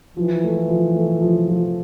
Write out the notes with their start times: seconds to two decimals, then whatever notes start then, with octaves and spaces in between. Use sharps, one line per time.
0.17 E3 F3
0.44 A3
0.69 F3
0.95 A3
1.21 F3
1.48 F3